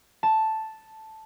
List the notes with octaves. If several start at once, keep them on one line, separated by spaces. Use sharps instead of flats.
A5